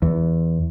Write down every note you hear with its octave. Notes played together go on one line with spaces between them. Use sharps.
E2